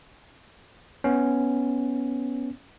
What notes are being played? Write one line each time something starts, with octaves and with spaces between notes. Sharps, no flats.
B3 C#4